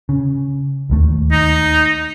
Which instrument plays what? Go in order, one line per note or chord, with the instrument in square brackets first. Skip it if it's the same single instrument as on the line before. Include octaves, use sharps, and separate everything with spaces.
[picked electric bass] C#3
D1 D#2 A3
[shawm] D#4